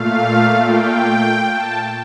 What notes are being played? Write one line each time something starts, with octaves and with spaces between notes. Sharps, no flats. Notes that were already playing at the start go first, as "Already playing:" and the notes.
Already playing: A#2 A3 F5
G5
A5